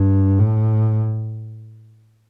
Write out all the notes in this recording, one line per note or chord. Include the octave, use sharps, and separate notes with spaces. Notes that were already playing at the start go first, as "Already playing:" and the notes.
Already playing: G2
A2